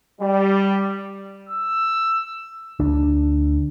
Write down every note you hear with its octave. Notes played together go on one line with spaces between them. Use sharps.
G3
E6
D2 D4